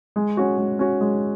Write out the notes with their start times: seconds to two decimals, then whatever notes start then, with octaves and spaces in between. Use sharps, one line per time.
0.16 G#3
0.37 C#4 F#4
0.58 G#3
0.79 C#4 F#4
1.01 G#3